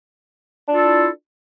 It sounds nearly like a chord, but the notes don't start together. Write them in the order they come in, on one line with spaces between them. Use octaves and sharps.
D4 F4 A4 E4